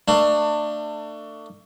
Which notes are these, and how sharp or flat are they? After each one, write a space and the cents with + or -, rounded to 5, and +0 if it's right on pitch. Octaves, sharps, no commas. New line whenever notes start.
A3 +30 D4 +25